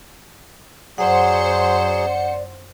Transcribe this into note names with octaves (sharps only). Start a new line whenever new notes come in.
F#2 F#3 G#4 C5 D5 F#5 C#7